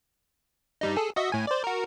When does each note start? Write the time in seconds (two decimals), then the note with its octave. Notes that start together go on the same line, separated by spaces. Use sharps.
0.81 G2 G3 D#4
0.96 G#4 A4
1.16 F#4 D#5 E5
1.32 A2 G#5
1.47 C5 D5
1.64 F#4 A#4